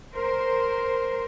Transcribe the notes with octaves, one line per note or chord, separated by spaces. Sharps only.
A#4 C5